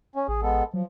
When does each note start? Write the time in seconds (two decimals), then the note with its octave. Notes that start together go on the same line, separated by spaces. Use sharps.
0.16 C#4
0.28 A1 G#4
0.42 G#3 B3 A4
0.74 F3 F#3